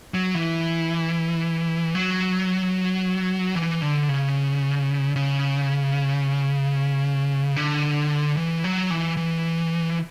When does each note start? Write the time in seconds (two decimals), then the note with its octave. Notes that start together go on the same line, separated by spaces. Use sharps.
0.14 F#3
0.35 E3
1.95 F#3
3.55 E3
3.82 D3
4.09 C#3
5.16 C#3
7.56 D3
8.37 E3
8.64 F#3
8.90 E3
9.17 E3